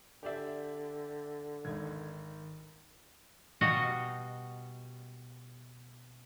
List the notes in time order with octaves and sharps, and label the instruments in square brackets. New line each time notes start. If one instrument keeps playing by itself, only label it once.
[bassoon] D3 [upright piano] G4 D5 E5
[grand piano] G#1 D#4 [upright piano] G#6
[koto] B2 G3 F#4 D#5 F5 F#5